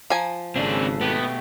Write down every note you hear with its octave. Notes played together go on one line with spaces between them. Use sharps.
F3 G#5 A#5
G#1 C#3 C4 D4 G#4 A4
B2 A3 B3 G4